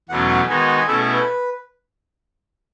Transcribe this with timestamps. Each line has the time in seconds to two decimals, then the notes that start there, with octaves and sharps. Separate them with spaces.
0.09 E2 B2 F#3 A3 C#4 F#5
0.29 F#5
0.48 D#3 G#3 B3 D#4 F#4 G#5
0.59 G#5
0.68 F#5
0.78 G#5
0.87 B2 A3 C#4 E4 A4
1.01 G#4
1.13 B4